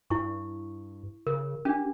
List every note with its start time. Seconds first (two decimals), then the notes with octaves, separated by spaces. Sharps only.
0.10 G2 E4 C#6
1.27 C#3 A#4
1.65 C#4 D4 G4